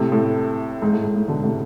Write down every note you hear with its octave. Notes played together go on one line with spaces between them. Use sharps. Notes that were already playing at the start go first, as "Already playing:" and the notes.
Already playing: A2 C3
A2
G#2
A2
G#2
A2
B2 D3
A2 C3